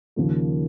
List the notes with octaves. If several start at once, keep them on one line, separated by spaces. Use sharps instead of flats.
D#2 C#3 F3 A#3